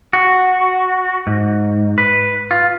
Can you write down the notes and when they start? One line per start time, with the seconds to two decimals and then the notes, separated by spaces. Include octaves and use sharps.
0.13 F#4
1.27 G#2
1.98 B4
2.51 F4